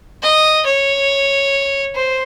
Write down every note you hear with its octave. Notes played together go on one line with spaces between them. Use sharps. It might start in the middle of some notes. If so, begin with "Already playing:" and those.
D#5
C#5
C5